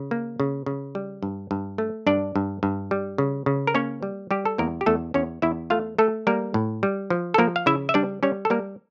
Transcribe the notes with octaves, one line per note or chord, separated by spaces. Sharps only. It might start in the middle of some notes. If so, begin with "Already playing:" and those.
Already playing: C#3
A#3
C#3
C#3
G3
G2
G2
A3
G2 D4 D5
G2
G2
G3
C#3
C#3
A#4
A#3 C#4 C#5
G3
G3 G4
A4
E2 A#3 A#4
G4
E2 A3 A4
E2 C#4 C#5
E2 E4 E5
A3 F4 F5
A3 A4
G3 A#3 A#4
A2
G3
F3
A4
F3 A#3 A#4
F5
C#3 E4 E5
E5
G3 D4 D5
G3 C#4 C#5
A4
G3 A#3 A#4